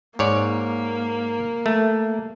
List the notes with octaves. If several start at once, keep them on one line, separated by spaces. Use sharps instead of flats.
G#2 A#3 C#5 D5
A3